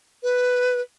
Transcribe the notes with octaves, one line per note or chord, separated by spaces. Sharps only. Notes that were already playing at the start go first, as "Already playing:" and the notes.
B4